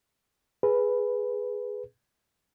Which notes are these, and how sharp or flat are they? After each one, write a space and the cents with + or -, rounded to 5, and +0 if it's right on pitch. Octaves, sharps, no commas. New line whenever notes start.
G#4 +0 B4 +0